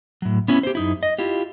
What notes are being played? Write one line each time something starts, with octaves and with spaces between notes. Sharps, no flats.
A2 F#3
B3 C#4 E4
G4 C5
F#2 D#4 E4
D#5
E4 F4 G4